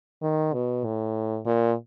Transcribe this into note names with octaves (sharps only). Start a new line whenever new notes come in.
D#3
B2
A2
A#2